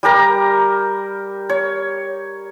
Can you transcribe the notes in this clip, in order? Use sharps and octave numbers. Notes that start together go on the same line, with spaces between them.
G3 G4 A#4 A#5
C#5